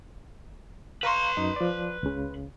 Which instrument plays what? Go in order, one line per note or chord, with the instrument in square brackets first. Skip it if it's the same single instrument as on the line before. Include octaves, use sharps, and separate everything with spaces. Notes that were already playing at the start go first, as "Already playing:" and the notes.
[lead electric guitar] B4 C6 [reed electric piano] F5 A#5 C#6
[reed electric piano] F#2 D#4
F3 D5
C#2 C#3